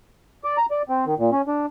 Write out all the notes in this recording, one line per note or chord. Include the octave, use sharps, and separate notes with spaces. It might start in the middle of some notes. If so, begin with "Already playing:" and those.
D5
A#5
D5
C4
D#3
A#2
C#4
D4